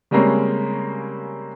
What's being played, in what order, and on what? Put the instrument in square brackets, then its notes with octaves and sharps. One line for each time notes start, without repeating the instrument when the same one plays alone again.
[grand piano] C#3 G3 G#3 A#3 C4 C#4